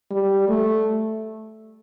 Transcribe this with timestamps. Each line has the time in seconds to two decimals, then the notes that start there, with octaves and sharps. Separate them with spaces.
0.11 G3
0.49 A3